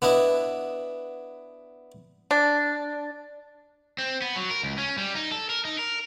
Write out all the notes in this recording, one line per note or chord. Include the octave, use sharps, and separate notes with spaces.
B3 D4 E4 D#5
D4
C4
B3
F#3
A#4
C#2
C#4
G3
D#4
A4
A#4
D#4
A#4